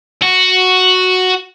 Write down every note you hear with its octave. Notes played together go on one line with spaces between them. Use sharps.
F#4